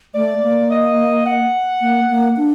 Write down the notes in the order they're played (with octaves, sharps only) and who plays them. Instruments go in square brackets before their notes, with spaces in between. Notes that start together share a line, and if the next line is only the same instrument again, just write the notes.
[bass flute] A3 [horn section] D5
[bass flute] A#3
[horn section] D#5
F#5
[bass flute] A#3
A#3
D4